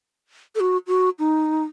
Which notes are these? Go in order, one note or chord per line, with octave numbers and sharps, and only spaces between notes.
A4
F#4
F#4
D#4